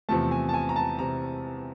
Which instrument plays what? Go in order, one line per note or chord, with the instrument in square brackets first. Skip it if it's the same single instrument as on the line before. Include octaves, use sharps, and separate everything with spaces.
[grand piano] E2 C3 F3 A3 A5
G#5
A5
G#5
A#5
A5
C3 A#5